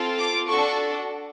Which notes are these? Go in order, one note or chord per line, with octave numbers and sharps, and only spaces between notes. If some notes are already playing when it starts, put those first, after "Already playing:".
Already playing: C4 F4 A4
D6
D4 F#4 A4 C#6